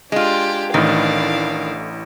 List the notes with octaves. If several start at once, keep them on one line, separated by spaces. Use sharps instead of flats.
G#3 D4 F4 G4
A1 A2 D#3 D4 F5